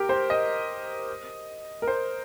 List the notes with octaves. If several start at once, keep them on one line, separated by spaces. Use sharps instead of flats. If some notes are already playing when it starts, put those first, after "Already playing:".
Already playing: G4 A#4
C5
D#5
A#4
C5